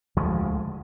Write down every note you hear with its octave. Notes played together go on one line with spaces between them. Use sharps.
D2 F3 G#3